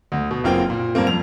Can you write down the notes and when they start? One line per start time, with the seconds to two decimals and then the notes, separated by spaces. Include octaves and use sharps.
0.12 D2
0.31 B2
0.44 F#1 F#2 A#3 C4 F4 G5
0.70 A#2
0.95 G2 A#3 C4
1.07 F2 F7